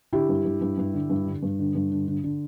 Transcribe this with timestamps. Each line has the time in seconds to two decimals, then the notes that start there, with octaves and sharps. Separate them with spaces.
0.13 D3 E4 G4
0.29 G2
0.45 G2
0.61 G2
0.78 G2
0.94 D3
1.10 G2
1.26 D3
1.43 G2
1.59 D3
1.75 G2
1.91 D3
2.08 D3
2.24 D3